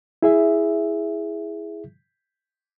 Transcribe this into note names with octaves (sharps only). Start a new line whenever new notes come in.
E4 G#4 E5